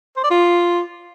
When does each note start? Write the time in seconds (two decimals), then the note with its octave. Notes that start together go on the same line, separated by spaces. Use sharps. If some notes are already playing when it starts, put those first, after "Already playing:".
0.17 C5
0.24 D5
0.31 F4